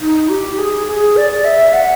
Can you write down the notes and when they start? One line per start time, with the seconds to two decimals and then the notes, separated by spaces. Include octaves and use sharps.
0.01 D#4
0.29 G4
0.59 G#4
0.87 G#4
1.17 D5
1.44 E5
1.73 F#5